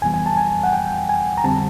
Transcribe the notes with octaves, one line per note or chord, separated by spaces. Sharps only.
F2 C3 E3 G3 B3 G#5
G#5
A5
G#5
F#5
G5
G#5
A#5
F2 D3 G3 C4 A5